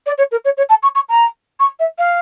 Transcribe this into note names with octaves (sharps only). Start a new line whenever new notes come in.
D5
C#5
A#4
C#5
C#5
A5
C#6
C#6
A#5
C#6
E5
F5